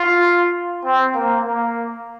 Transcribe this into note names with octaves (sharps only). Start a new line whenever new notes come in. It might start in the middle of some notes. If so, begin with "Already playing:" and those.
Already playing: F4
C4
A#3
A#3